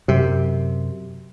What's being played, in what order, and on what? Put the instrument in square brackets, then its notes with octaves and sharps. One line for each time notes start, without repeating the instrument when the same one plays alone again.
[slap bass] F#2 C3